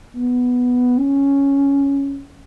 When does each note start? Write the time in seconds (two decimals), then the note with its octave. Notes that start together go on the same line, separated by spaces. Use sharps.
0.16 B3
0.98 C#4